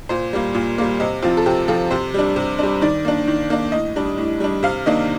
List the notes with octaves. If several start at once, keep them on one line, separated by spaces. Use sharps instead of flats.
A#2 C5
G3 A#3
A#2
G3 A#3
C3 D#5
F3 C4 F4
A4
C3 G4
F3 C4 A4
C3 C5
G3 D4
C3
G3 D4
D#3 D5
A#3 D4
D#3
A#3 D4
A2 D#5
G3 D4
A2
G3 D4
C3 F5
D#3 A#3 D4 D#5